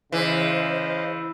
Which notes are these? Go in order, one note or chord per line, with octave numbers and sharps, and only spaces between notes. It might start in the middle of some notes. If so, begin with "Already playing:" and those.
C#3 E3 C5 D#5 F5